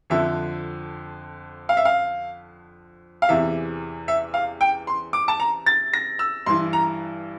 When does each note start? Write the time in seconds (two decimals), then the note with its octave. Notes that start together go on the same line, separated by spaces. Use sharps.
0.10 F2 D3 F3 E5
1.69 F5
1.77 E5
1.85 F5
3.22 F5
3.29 E2 C3 E3 E5
4.08 E5
4.34 F5
4.61 G5
4.87 C6
5.13 D6
5.28 A5
5.40 A#5
5.66 A6
5.93 A#6
6.19 E6
6.46 G2 E3 C6
6.73 A#5